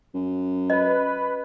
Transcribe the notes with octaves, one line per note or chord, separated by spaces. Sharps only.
F#2
B4 D#5